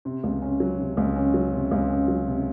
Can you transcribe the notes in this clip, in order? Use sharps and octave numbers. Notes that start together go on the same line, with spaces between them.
C3
C#2
C#4
F#3
C3
C#2
C#4
F#3
C3
C#2
C#4
F#3
C3